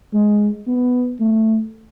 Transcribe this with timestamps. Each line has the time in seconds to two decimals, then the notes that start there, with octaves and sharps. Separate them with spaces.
0.13 G#3
0.67 B3
1.20 A3